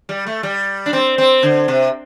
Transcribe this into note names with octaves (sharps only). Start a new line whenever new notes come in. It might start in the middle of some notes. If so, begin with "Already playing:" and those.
G3
A3
G3
D4
C4
C4
D3
C3